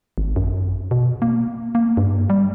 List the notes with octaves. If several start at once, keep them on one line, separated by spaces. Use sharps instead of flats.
G#1
F#2
B2
A#3
A#3
G2
G3